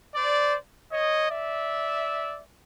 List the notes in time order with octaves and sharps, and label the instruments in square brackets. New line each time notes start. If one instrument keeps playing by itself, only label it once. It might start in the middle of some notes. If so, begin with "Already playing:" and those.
[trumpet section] C5 D5
C#5 D#5
D5 E5